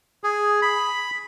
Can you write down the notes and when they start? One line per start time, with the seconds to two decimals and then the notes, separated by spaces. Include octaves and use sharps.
0.24 G#4
0.62 B5